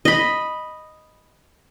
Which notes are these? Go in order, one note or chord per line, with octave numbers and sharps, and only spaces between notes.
D#5 B5